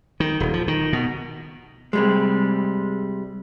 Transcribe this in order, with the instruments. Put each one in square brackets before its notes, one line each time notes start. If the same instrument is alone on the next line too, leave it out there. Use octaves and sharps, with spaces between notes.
[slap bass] D#3
D#1
F3
D#3
B2
[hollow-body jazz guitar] C3 G3 G#3